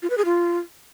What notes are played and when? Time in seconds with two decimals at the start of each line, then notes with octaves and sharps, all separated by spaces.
0.02 F4
0.10 B4
0.18 G#4
0.25 F4